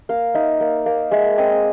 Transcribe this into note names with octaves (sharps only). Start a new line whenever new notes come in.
A#3 F5
D#4 E5
A#3
A#3
G#3 E5
C4 D#5